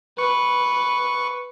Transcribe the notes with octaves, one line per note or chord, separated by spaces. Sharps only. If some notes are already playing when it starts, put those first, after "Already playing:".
B4 C#6